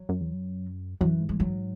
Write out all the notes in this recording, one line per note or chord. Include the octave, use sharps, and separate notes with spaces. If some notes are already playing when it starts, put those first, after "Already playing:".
Already playing: F#3
F#2
E2
F#2
F#2 E3
G#2
G#3
F#3